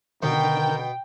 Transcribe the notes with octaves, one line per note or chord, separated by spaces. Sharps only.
B2 D3 D#3 A#4 G5 G6